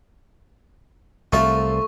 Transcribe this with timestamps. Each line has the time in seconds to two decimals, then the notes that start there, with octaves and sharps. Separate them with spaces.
1.32 C2 A3 F4 E5 C#6